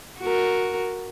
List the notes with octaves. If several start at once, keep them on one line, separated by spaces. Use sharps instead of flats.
F#4 A#4